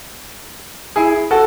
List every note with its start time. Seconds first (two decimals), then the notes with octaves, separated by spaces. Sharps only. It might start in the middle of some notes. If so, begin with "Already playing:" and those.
0.96 E4 G#4
1.31 F#4 A4